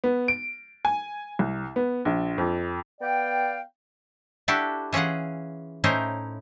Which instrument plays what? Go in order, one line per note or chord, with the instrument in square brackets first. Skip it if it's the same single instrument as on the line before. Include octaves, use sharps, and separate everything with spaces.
[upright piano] B3
D7
G#5
C2
B3
A#1
F2
[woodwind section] B3 D5 F5 G5
[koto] D4 E4 F#4 G4 A4
E3 C#4 F4 G#4 F#5
A2 C#4 D#4 E4 A#4 C5